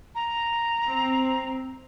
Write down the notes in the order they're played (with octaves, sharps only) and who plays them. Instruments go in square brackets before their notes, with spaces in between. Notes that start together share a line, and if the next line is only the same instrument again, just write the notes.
[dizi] A#5
[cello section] C4